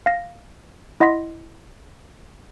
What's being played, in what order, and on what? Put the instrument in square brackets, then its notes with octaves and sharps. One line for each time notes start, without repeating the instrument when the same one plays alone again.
[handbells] F5 A#6
E4 D#5 F#5 C6 A#6 B6